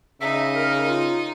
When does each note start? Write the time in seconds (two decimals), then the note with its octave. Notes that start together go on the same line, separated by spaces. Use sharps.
0.21 C#3 D#4 E5
0.56 A#4
0.89 F4